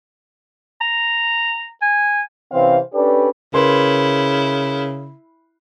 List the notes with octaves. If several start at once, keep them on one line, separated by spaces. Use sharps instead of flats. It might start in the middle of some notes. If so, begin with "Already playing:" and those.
A#5
G#5
C3 E3 C4 C#4 C5 F5
C#4 D4 G4 A4 B4 D5
C#3 E4 A#4 B4 C6